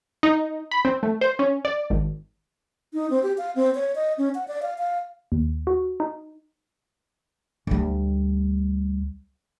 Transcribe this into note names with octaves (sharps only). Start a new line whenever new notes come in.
D#4
B5
C4
A3
C5
C#4
D5
G#1
D#4
C4
G4
F5
C4
C#5
D#5
C#4
F#5
D5
F5
F5
D#2
F#4
D#4
D2 G3